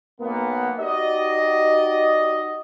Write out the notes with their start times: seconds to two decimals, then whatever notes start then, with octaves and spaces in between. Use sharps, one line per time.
0.21 B1 A#3 B3
0.79 D#4 F#4 G4 D5 D#5